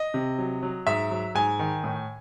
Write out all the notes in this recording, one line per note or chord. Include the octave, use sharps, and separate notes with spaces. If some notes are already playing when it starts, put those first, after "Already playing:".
Already playing: D#5
C3
F#3
F#3
G#2 E5
F#3
G#2 G#5
D#3
A2